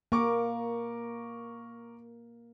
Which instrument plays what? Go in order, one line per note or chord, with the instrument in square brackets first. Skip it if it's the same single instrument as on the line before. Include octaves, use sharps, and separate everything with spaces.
[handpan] A#3 [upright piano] A#4 C#6 D6